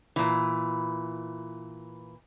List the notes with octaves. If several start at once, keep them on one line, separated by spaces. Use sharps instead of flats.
A#2 E3